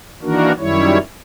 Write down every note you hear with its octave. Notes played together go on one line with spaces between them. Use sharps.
D#3 E3 A#3 D4 F#4 A#4
F#2 D#3 G3 E4 C#5